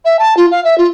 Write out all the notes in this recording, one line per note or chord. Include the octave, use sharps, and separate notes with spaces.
E5
A5
F4
F5
E5
F4